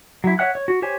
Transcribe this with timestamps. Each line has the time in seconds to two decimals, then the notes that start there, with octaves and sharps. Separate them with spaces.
0.24 F#3 E4
0.39 C#5 E5 F#5 F#6
0.55 C#5
0.68 F#4
0.82 G4 C5 C#5 G#5